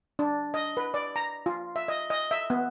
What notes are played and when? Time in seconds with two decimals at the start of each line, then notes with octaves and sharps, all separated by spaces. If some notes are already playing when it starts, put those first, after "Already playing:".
0.19 D4
0.54 D#5
0.77 B4
0.94 D5
1.16 A#5
1.46 F4
1.76 E5
1.88 D#5
2.10 D#5
2.31 E5
2.50 B3